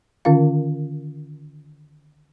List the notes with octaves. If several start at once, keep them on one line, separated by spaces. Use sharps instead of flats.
D3 D#3 C#4 F4 F5